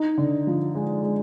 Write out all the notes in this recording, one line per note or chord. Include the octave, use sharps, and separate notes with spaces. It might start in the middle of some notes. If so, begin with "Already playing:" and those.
Already playing: D#4
D3
F3
G#3
G#3